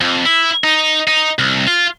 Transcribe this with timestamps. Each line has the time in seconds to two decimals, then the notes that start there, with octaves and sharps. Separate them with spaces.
0.01 F2
0.25 E4
0.64 D#4
1.07 D#4
1.39 C2
1.67 F4